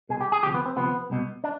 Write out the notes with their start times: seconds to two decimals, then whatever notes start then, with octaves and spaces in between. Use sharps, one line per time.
0.09 C2 B2 G#4
0.21 G4
0.32 G#4
0.43 D2 C3 F3 G4
0.55 B3
0.66 C4
0.76 D2 C3 F3 B3
1.10 C2 B2
1.44 D4